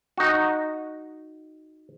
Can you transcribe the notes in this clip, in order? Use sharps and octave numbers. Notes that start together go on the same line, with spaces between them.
D#4 F#4